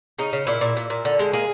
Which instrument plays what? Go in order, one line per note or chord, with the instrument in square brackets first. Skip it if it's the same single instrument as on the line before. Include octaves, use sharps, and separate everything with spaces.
[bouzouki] C#3 D#4
C#3
A#2 E4
A#2
A#2
A#2
D3
G#3
A#3 G#4